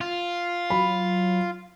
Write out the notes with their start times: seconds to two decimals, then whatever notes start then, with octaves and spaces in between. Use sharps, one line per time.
0.01 F4
0.70 F#3 B5